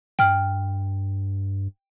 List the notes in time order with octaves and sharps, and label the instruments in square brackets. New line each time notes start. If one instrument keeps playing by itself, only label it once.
[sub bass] G2 [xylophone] G5 F6